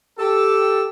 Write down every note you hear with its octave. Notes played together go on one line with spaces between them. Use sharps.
G4 A4